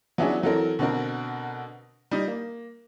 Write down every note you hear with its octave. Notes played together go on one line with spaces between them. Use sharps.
F#3 B3 C#4 D4 E4 G#4
E3 F#3 C4 A4 A#4
B2 D3 C4 A#4
G3 D#4
A#3